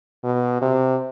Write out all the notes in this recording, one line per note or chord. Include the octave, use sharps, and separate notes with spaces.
B2
C3